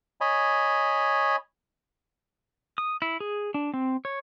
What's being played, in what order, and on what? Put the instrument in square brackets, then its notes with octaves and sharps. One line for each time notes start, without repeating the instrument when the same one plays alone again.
[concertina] C#5 D#5 G#5 B5
[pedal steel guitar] D#6
E4
G#4
D4
C4
C#5